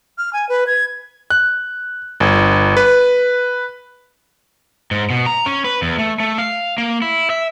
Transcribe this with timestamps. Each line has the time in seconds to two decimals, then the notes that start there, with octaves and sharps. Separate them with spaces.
0.18 F6
0.33 G#5
0.49 B4
0.67 G#6
1.30 F#6
2.20 G1
2.77 B4
4.91 G#2
5.10 B2
5.26 A#5
5.46 C#4
5.64 B4
5.82 E2
5.98 A3
6.20 A3
6.38 F5
6.78 A#3
7.02 E4
7.30 E5